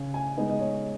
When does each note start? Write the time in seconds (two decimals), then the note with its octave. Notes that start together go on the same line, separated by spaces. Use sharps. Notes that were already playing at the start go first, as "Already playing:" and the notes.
Already playing: C#3
0.14 G#5
0.37 G#3 B3 D#4
0.50 D#5
0.60 C#5